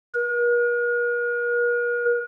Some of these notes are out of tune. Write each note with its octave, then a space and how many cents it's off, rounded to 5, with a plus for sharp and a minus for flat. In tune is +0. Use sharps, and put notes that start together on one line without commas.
A#4 +45